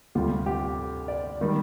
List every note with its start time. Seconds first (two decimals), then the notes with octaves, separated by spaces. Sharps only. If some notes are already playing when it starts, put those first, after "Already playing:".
0.15 D2 C3 G3 F4
0.46 G4
1.08 D5
1.41 D#3 G3